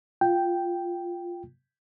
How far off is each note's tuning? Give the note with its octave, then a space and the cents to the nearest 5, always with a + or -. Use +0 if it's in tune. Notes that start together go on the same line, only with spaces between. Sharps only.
F4 +0 G5 +0